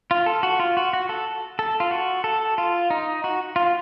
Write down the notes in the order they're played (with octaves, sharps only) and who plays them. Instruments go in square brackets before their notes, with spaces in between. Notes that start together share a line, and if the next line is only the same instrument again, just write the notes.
[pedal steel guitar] F4
A4
F#4
F4
F#4
F#4
A4
A4
F4
F#4
A4
F4
D#4
F#4
F4